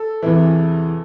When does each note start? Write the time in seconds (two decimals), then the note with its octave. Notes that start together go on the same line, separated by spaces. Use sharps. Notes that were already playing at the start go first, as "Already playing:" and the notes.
Already playing: A4
0.22 E2 C3 E3